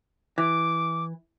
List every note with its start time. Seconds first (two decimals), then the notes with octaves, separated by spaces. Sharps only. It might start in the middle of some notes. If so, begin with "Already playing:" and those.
0.38 E3 D6